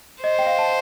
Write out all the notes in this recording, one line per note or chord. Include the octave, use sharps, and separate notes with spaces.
C5 D#5
G5
F5
A5